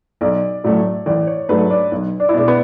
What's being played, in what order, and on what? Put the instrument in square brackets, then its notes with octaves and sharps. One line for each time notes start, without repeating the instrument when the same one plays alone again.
[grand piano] B1 [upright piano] D5
[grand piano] A2 F#3 A3 C#4 [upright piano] D5
[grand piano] A1 [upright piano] D5
[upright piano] C#5
[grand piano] G#2 F#3 A3 D4 [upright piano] B4
[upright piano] D4
[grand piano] B1
[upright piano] D4
E4
[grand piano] B2 G#3 [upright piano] D4
[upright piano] B3